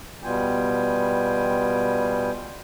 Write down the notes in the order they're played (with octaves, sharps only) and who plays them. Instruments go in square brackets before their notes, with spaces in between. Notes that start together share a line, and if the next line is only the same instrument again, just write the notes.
[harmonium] B2 G3 B3 F4 G5 G#5